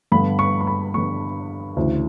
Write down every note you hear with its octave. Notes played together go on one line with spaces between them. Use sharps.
G2 D3 G3 B3 B5
C#6
C#6
B5
G2 D3 G3 B3 C#6
D2 C#3 E3